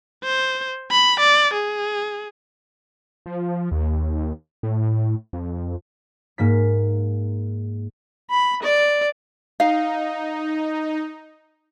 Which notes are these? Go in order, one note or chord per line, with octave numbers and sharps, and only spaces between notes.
C5
B5
D5
G#4
F3
D#2
A2
F2
G#2 A#3 B6
B5
D5
D#4 F5